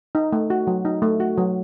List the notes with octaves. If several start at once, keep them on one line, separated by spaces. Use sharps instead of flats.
D#4
A3
F#4
F#3
D#4
A3
F#4
F#3